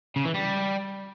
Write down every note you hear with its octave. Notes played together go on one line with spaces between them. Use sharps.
C#3
E3
G3